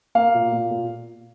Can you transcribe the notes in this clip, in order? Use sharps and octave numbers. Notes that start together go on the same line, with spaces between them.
A#3 F5
A#2
A#2
A#2